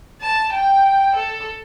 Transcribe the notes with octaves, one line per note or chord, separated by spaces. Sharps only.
A5
G5
A4